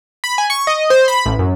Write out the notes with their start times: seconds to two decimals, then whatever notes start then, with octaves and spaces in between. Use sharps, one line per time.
0.24 B5
0.38 G#5
0.50 C#6
0.67 D#5
0.90 C5
1.08 B5
1.26 A1
1.39 F#2